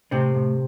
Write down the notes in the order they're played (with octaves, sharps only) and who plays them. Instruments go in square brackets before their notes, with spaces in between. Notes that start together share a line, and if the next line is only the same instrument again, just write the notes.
[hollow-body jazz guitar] A2 C3 C4
A2